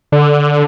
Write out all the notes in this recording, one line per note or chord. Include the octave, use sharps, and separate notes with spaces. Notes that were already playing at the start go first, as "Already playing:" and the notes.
D3